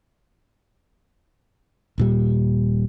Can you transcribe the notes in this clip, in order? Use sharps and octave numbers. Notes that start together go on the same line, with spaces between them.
D#1 A#2 G3